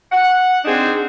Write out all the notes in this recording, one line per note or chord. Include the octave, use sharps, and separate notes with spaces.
F#5
C4 D4 D#4 G#4 C5